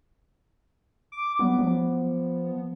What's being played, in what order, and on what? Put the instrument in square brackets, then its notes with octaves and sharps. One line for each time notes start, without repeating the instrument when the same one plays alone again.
[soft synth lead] D6
[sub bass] F#3 [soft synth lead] B3
[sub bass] F3